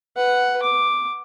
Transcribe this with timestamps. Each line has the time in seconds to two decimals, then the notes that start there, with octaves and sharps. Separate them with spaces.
0.16 B4 F#5
0.63 D6